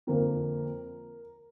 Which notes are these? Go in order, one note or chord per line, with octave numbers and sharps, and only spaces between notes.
F2 D3 F3 A#3 A#4